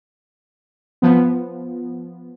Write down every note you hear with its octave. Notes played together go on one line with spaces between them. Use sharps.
F3 B3